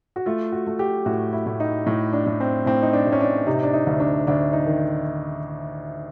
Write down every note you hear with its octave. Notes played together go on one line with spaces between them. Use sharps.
F#4
A3 F4
F#4
A3
G4
A2 F#4
E4
A2
D#4
A2
D4
A2
C4
A2 C4
D#4
D4
A2
C#4
D4
C3 D#4
D4
D#4
D2
D4
D2 D4
D#4
D#3